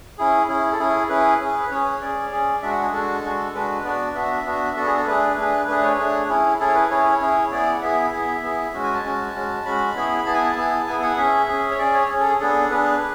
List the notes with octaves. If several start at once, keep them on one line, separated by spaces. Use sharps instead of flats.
C#4 E4 G#4
C#4 E4 G#4
A4
C#4 E4 G#4
C#4 E4 G#4 B4
C#4 G#4
B4
C#4 G#4 C#5
C#4 G#4 D5
C#4 G#4
G#3 D4 F#4 E5
F#5
G#4
G#3 D4 F#4 A4
G#3 D4 F#4
G#3 D4 F#4 B4
B3 D4 F#4 D5
B3 D4 F#4 E5
B3 D4 F#4
B3 D4 F#4 A4
G#4
A4
A3 D4 G#4 B4
A3 D4 G#4
A3 D4 G#4 B4
C#5
A3 D4 G#4
C#4 E4 G#4
C#4 E4 G#4 A4
C#5
B4
C#4 E4 G#4 C#5
C#4 E4 G#4
B3 E4 G#4 D5
F#5
B3 E4 G#4 E5
B3 E4 G#4
B3 E4 G#4
G#3 C#4 F#4
G#5
A5
G#3 C#4 F#4
G#3 C#4 F#4
G#3 C#4 F#4 B5
B3 E4 G#4
B3 E4 G#4 A5
G#5
A5
B3 E4 G#4
B3 E4 G#4 G#5
F#5
C#4 G#4 E5
C#4 G#4
C#5
C#4 G#4 D5
C#5
C#4 G#4
A4
G#4
B3 D4 G#4 A4
B3 D4 G#4 B4